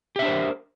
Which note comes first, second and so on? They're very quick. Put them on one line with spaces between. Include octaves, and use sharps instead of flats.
G4 E5 D4 C5 A#4